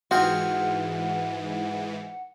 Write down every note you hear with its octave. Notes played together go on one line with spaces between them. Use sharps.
G#2 E3 F4 F#4 G#4 F#5 G5